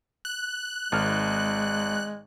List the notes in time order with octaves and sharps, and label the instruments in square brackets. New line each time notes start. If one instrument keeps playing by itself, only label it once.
[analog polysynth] F#6
[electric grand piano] G#1 F6 [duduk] G#3